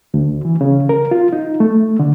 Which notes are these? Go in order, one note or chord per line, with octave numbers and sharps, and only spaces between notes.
D2
E3
C#3
A#4
F4
D#4
A3
D3